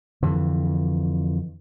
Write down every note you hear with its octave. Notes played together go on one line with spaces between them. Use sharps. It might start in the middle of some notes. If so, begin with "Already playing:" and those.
F2 D3 E3